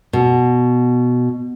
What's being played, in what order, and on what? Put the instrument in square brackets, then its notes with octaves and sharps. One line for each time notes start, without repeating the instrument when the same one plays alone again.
[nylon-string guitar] B2